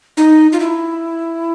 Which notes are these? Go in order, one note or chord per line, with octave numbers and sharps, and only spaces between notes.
D#4
F4
E4